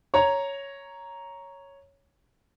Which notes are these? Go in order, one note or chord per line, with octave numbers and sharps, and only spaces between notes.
C#5 A#5